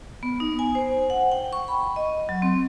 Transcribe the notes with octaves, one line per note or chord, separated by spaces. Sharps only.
B3
D#4
G#5
C5
F#5
G5
C#6
B5
D#5
F#3
C4